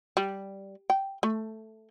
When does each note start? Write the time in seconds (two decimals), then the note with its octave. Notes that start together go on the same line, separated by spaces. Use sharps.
0.17 G3
0.90 G5
1.23 A3